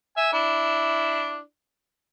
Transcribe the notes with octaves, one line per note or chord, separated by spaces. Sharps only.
E5 G#5
D4 E4